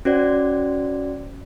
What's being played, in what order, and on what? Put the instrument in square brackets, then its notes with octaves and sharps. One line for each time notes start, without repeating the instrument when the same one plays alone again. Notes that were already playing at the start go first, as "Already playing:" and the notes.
[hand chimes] C#4 F#4 C5 D5